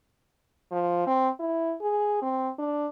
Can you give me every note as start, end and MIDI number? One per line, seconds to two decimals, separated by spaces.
0.71 1.03 53
1.07 1.29 60
1.39 1.74 64
1.81 2.20 68
2.22 2.50 60
2.58 2.87 62